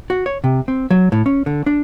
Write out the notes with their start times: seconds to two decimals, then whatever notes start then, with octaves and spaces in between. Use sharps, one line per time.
0.10 F#4
0.26 C#5
0.44 C3
0.68 C4
0.90 F#3
1.12 A2
1.26 C#4
1.46 D3
1.66 D4